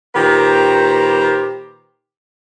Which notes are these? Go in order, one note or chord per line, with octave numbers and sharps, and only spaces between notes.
A#2 D#3 G4 B4 C5 A#5